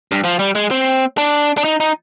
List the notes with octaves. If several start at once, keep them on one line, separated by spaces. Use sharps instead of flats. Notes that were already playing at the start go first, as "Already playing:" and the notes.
G2
F3
G3
G#3
C4
D4
D4
D#4
D#4